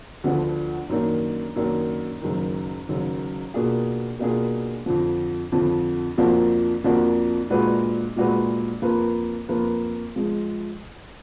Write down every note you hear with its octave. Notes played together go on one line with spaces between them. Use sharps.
D2 D3 F3 B3 D4
F#2 D#3 A#3 D4
F#2 D#3 A#3 D4
F#1 F#2 D#3
F#1 F#2 D#3
B2 A#3 D4 F4 G#4
B2 A#3 D4 F4 G#4
F2 D3 F3
F2 D3 F3
F2 F3 A#3 D4 F#4
F2 F3 A#3 D4 F#4
A#2 G#3 D4 F#4 B4
A#2 G#3 D4 F#4 B4
F2 F3 A#3 F4 B4
F2 F3 A#3 F4 B4
F3 G#3